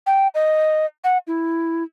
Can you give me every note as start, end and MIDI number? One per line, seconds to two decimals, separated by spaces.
0.06 0.28 79
0.35 0.86 75
1.04 1.18 78
1.27 1.83 64